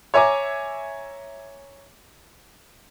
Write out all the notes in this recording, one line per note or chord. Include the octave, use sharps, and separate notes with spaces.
C#5 E5 G#5 A#5 D6